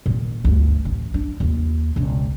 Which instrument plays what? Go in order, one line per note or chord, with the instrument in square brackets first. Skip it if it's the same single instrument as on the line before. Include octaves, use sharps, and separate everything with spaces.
[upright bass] A#2 D#3
D2 G2
A1
D4
D#2 F4
E1 C#2